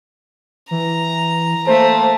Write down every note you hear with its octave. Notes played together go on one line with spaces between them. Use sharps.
E3 A#5
A3 A#3 C5